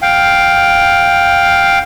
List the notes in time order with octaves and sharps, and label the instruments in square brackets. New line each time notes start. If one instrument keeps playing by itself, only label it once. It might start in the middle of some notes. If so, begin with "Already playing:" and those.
[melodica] F5 G5